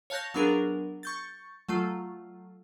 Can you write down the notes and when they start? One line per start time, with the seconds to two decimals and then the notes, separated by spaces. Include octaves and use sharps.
0.10 C#5 F5 A5 F#6 G6 A#6
0.34 F#3 B3 D4 G#4 A#4
1.03 C#6 G6 A6
1.69 F#3 A3 F4